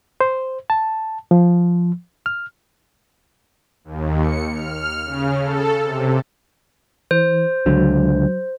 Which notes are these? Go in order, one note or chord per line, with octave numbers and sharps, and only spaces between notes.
C5
A5
F3
F6
D#2
C#7
F6
C#3
A4
C3
E3 C5
C#2 D3 F#3